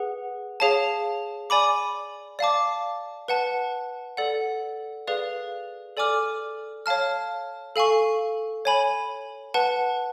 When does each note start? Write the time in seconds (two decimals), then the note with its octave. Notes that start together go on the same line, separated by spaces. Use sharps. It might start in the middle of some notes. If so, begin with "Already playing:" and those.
Already playing: G#4 B4 F#5
0.60 G#4 C#5 F5 A5
1.50 D5 G#5 B5 D6
2.39 D5 F5 A5 D6
3.28 B4 F#5 A5
4.17 A4 D5 F#5
5.07 G#4 B4 D5 F5
5.97 A4 D5 G#5 D6 F6
6.86 C#5 F5 A5 F6
7.76 A4 F5 G#5 C#6
8.65 C#5 G#5 B5
9.54 B4 F#5 A5